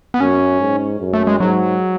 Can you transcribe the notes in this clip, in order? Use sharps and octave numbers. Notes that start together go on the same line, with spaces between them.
B3
F#2 C#4
G#2
F#2
A3
G#3
G#2 F#3